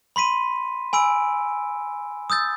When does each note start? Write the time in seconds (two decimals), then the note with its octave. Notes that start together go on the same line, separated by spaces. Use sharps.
0.16 B5 C6 B6 D#7
0.93 G#5 B5 E6 D7
2.30 D#6 E6 G6 A6